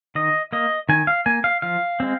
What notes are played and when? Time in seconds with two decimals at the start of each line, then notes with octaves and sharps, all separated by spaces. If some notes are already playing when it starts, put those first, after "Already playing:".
0.15 D#3 D#5
0.53 A#3 D#5
0.89 D#3 G#5
1.07 F5
1.26 A#3 G#5
1.44 F5
1.62 F3 F5
2.00 G#3 C4